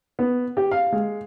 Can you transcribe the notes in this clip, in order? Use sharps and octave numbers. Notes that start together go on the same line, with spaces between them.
B3
G4
F5
G#3